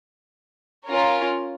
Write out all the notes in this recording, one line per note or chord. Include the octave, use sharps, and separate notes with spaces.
C#4 F4 A#4 C#5